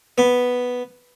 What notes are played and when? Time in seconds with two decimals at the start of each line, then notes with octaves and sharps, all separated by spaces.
0.18 B3